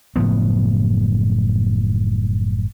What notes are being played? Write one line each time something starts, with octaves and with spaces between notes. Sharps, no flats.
F#1 A2 F3 B3